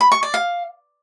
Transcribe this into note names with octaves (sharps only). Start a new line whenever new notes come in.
B5
C#6
D5
F5